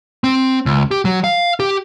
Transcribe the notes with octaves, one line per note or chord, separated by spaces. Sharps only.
C4
C#2
G4
F#3
F5
G4